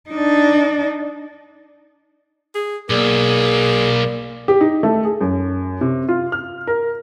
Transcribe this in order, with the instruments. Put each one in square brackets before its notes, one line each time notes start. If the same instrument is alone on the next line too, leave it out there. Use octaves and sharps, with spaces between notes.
[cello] D4 D#4
[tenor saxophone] G#4
[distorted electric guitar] B1 [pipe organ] A#3 D5 [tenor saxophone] G#4
[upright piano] G4
D#4
A3
G#4
F#2
C3
F4
F6
A#4